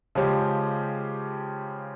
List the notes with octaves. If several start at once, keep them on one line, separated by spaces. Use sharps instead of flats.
C#3 F3 G#3 C#4 G4